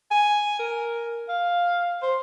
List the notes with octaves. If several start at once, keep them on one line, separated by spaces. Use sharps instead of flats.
G#5
A#4
F5
C5